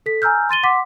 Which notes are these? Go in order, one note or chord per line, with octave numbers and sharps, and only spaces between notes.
A4 B6
G#5 A#5 E6 F6 G6
C6 A6 D#7 G7
F#5 C6 D6 B6